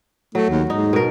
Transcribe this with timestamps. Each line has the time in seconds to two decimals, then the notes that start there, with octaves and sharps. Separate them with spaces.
0.35 F#3 A3
0.50 D#2
0.70 G#2 D#4
0.93 B2 A#4